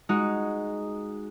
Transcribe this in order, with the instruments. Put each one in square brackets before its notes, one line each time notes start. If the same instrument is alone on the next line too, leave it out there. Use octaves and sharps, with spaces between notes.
[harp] G#3 D#4 F#4